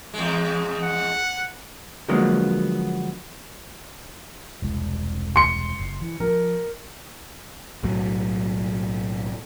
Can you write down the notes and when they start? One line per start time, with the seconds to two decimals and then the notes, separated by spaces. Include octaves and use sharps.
0.14 E2 G#3
0.83 F#5
2.08 D3 F3 F#3 G#3 A#3 B3
4.62 E1 C2 G#3
5.36 C6 C#7
5.79 F#1
6.02 E3
6.20 F3 A#4
7.83 B1 A2 F#3